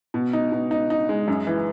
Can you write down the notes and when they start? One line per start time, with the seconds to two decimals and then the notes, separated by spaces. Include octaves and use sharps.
0.14 B2
0.33 D#4
0.52 B2
0.71 D#4
0.90 D#4
1.09 G#3
1.28 F#2
1.47 E3